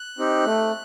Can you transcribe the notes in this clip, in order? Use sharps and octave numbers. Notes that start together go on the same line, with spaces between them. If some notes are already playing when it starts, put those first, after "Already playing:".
Already playing: F#6
C4 D#4 G4
A3